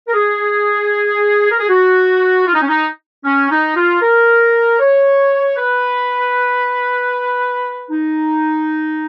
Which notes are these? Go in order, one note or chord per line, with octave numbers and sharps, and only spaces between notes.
A#4
G#4
A#4
G#4
F#4
F4
D#4
C#4
D#4
C#4
D#4
F4
A#4
C#5
B4
D#4